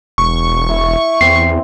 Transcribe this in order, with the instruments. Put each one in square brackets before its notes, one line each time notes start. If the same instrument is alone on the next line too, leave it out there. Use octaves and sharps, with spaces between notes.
[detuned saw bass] E1 [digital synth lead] C#6
[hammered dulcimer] E4
[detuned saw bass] E2 [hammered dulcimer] C4 [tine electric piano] C7